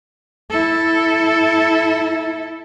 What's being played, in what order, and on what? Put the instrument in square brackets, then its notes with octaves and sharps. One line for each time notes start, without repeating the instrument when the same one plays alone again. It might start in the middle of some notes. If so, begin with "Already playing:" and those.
[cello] E4 A4